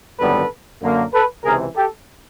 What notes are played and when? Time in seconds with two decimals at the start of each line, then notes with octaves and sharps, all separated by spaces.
0.19 G#1 F#2 D3 G3 B3 A4 B4
0.81 F#2 D3 F#3 A#3
1.13 A4 B4
1.44 C#2 C3 E3 G#4 A#4
1.75 G4 A4